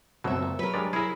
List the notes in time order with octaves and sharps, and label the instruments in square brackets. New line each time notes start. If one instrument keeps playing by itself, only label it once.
[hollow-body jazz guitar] C#2 F#2 C4 [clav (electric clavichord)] B2 F#3 [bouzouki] A4 E5
[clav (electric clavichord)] A#2
[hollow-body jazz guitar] F#3 [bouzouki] A#4 B4
[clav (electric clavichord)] G2 G#3 D5
[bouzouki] E4 [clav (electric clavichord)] G#4 A#4